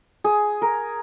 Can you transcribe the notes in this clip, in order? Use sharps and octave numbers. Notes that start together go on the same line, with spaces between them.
G#4
A#4